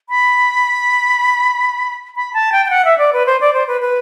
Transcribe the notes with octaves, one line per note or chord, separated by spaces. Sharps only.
B5
B5
A5
G5
G5
F#5
E5
D5
B4
C5
D5
C5
B4
B4